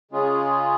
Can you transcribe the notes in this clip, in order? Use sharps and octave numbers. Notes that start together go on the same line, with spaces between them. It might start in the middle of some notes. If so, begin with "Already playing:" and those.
C#3 G#3 C#4 F4 G#4